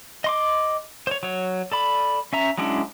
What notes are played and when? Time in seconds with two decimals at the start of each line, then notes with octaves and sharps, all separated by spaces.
0.24 D#5 C6 D6
1.07 C5 C#5
1.23 F#3 C#5
1.72 A4 D5 B5
2.33 C#4 E5 A#5
2.58 F#3 G#3 C#4 D4 E4